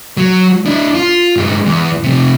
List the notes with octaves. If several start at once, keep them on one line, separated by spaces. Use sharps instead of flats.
F#3
D4 E4
F4
G2 G#3
E2
F2 C3